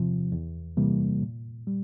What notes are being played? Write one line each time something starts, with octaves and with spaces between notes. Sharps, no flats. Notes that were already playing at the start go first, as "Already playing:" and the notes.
Already playing: E2 C3 F3
E2
C3 E3 G3 A#3
A#2
G3